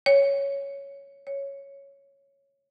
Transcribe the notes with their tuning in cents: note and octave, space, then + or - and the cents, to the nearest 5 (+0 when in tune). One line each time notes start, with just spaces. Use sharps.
C#5 +5
C#5 +0